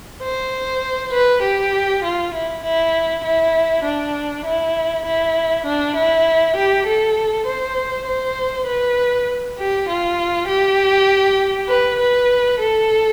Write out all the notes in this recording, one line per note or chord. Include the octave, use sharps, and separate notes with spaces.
C5
B4
G4
F4
E4
E4
E4
D4
E4
E4
D4
E4
G4
A4
C5
C5
B4
G4
F4
G4
B4
B4
A4